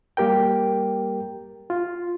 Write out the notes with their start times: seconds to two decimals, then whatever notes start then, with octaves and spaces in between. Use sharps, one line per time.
0.17 G3 A#3 G4 A#4 G5
1.70 F4